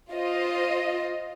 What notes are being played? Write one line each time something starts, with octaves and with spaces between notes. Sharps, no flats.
F4 C5 D#5